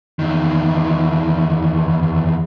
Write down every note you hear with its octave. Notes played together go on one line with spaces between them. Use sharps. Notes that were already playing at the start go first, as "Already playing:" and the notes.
E2 D#3